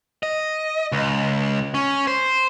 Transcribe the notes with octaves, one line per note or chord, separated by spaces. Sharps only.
D#5
C#2
C#4
C5